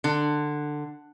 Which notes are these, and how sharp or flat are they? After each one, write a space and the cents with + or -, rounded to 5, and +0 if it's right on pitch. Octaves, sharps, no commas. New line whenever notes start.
D3 +15